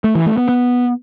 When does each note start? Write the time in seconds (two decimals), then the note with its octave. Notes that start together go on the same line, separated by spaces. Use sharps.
0.04 A3
0.15 E3
0.26 A3
0.37 B3
0.49 B3